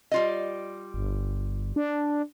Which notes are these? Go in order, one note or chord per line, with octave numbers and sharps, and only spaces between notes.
G3 F4 D#5
G1
D4